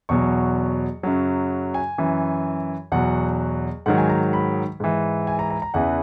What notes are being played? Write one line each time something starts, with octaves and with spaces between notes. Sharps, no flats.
E2 B2 F#3 C#6
F#2 C#3 F#3
G#5
F#2 E3
E2 B2 F#3 F#5
G#2 D#3 F#3 F#5
G#5
A#5
B5
G#2 E3
G#5
A#5
A#5
A#5
E2 C#3 E3 F#5